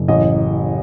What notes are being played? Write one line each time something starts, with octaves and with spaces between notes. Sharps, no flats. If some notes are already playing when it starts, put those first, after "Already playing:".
Already playing: F#1
A1 D#5